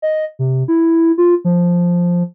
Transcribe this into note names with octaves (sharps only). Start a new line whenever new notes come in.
D#5
C3
E4
F4
F3